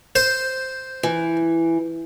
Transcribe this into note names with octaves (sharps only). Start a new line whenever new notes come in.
C5
E3